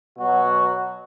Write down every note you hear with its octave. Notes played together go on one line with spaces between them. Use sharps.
B2 F#3 F#4